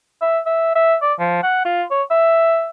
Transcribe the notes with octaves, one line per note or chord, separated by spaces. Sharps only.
E5
E5
E5
D5
F3
F#5
F4
C#5
E5